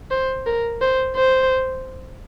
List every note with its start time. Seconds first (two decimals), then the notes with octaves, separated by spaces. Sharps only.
0.11 C5
0.46 A#4
0.81 C5
1.16 C5